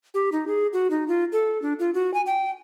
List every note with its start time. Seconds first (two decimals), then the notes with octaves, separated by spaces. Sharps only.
0.14 G4
0.32 D#4
0.47 G#4
0.73 F#4
0.91 D#4
1.08 F4
1.32 A4
1.62 D4
1.79 F4
1.94 F#4
2.14 G#5
2.26 G5